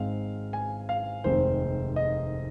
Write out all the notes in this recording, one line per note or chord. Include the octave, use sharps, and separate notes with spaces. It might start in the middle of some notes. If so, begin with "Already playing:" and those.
Already playing: G#1 G#2 G#3 C4 F5
G#5
F5
F1 D#2 D#3 G#3 C4 C5
D#5